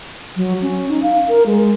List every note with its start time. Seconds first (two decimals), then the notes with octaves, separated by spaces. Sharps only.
0.36 F#3
0.62 C#4
0.89 D#4
1.03 F5
1.28 A#4
1.46 G#3